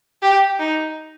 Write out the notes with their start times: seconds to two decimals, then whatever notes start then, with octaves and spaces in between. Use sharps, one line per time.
0.22 G4
0.59 D#4